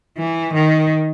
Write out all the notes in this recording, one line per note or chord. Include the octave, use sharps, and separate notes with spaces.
E3
D#3